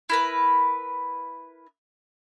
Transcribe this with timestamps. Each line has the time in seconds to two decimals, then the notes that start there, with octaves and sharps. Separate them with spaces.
0.09 E4 A#4 B4